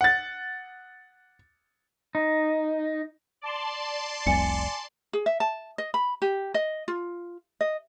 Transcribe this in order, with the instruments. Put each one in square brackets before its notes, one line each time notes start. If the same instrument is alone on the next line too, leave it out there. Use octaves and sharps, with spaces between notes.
[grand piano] F#5 A6
[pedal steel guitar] D#4
[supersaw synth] D5 A5 C6
[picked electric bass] F1 C2 [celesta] G#5 C#7
[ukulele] G#4
E5
A5
D#5
B5
G4
D#5
F4
D#5